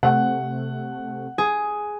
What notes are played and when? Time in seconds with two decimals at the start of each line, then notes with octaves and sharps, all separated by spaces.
0.03 C3 A3 F#5
1.38 G#4